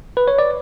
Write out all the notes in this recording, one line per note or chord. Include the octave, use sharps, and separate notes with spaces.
B4
C#5
D5